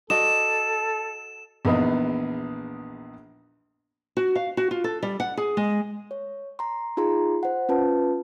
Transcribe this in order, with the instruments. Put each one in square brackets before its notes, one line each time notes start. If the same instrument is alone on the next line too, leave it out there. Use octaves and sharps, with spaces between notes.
[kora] F#4 D5 D#5 [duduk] A4 [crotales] E7
[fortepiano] A#1 E2 B3 D#4
[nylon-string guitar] F#4
F5
F#4
F4
A4
G3
F#5
G#4
G#3
[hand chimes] C#5
A#5 C6
D#4 F4 G#4 A#5 C6
C5 F#5
C#4 F4 B4 A5